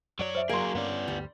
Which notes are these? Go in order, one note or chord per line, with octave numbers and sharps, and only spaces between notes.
F#2 F#3 C#5 D5
C5 E5
F#3 A#3 G#4 C6 D7
G2 D3 B3 C#4 D5
D2 G2 G3